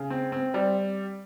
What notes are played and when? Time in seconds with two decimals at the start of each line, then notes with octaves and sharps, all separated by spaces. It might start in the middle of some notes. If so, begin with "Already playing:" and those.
Already playing: C#3
0.10 C4
0.32 C4
0.54 G3